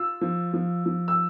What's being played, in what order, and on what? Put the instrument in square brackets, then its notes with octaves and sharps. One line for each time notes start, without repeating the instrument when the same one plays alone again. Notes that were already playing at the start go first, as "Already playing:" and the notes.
Already playing: [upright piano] F4 E6
F3
F3
F3
E6